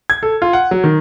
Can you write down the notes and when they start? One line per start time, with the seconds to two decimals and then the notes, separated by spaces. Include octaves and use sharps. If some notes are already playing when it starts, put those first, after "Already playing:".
0.10 G#6
0.23 A4
0.42 F4
0.53 F#5
0.71 F#3
0.84 D#3